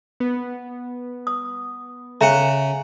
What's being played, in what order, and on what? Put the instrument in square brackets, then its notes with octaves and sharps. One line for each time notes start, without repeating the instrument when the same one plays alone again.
[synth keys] B3
[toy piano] D#6
[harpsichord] C#3 F#5 [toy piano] E5 A#5